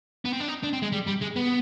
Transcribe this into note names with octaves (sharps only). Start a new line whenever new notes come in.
B3
C4
D4
D#4
D4
C4
G#3
G3
G3
G#3
B3